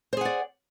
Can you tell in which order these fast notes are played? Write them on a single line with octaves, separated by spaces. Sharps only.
C5 G#4 F#5 D5